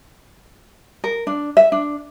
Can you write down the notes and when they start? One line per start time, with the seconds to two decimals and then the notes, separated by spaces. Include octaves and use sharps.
1.04 A#4
1.27 D4
1.57 E5
1.72 D4